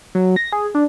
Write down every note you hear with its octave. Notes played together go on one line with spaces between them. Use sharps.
F#3
A#6
G#4
D4